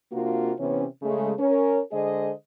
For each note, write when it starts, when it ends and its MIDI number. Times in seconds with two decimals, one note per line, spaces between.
0.12 0.52 48
0.12 0.52 58
0.12 0.52 62
0.12 0.52 65
0.12 0.52 66
0.12 0.52 70
0.59 0.85 48
0.59 0.85 52
0.59 0.85 59
0.59 0.85 61
1.02 1.33 49
1.02 1.33 56
1.02 1.33 57
1.39 1.80 61
1.39 1.80 70
1.39 1.80 73
1.92 2.32 50
1.92 2.32 56
1.92 2.32 68
1.92 2.32 72
1.92 2.32 75